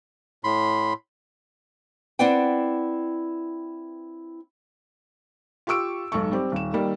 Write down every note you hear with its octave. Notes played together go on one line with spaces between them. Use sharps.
A2 B5 C6
C4 E4 B4 D5 F#5 G5
F4 G4 C#6 E6 D7
B1 G#2 A4 C#6
G3 C4 G4
D#1 E7
D#3 G3 A#3